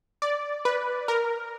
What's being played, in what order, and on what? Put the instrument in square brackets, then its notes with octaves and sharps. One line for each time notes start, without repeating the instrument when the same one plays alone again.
[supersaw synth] D5
B4
A#4